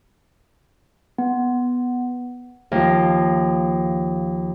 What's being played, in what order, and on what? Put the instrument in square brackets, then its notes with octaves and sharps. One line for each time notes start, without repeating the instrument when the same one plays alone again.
[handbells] B3
[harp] D#2 F3